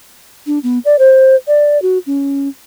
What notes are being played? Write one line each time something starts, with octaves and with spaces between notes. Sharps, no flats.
D4
B3
D5
C5
D5
F#4
C#4